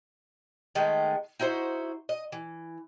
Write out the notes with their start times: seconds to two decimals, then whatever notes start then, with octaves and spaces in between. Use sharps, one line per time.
0.75 D#3 G#3 A3 B3
1.40 D#4 E4 F#4 C5
2.09 D#5
2.32 E3